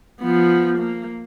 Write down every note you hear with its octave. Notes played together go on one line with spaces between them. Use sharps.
F3 B3
A#3